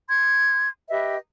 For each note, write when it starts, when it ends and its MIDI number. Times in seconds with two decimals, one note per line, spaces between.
0.09 0.69 84
0.09 0.69 92
0.89 1.16 67
0.89 1.16 71
0.89 1.16 75
0.89 1.16 76